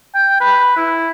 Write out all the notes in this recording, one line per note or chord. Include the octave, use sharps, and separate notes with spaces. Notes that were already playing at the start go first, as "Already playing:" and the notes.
G5
B4
E4